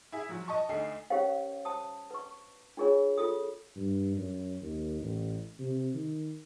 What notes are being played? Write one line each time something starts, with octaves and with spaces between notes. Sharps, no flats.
E4 G#4 E5
F3 F#3 F#4
D#5 A5 C#6
D2 A3 D#4 C7
C#4 G4 A#4 C5 C#5 F5
C5 A5 D#6
B4 C#6
D4 F4 G#4 A#4 C#5
F4 A4 D#6
G2
F#2
D#2
A1
C3
D#3